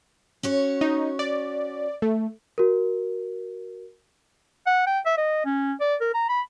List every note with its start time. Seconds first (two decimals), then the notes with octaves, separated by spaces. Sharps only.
0.43 C#4 F#4 C#5
0.81 D#4
1.19 D5
2.02 A3
2.58 F#4 A#4
4.66 F#5
4.87 G5
5.06 E5
5.18 D#5
5.45 C#4
5.81 D5
6.01 A#4
6.14 A#5
6.29 B5